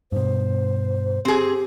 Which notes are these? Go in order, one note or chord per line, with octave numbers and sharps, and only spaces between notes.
G2 B2 C5
C4 G4 G#4